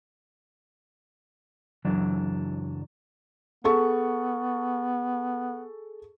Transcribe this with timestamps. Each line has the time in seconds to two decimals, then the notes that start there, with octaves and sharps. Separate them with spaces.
1.85 C#2 F#2 E3 F#3 D4
3.64 B3 G#4 A4 C#6